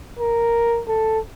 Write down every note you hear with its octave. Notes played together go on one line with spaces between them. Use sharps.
A#4
A4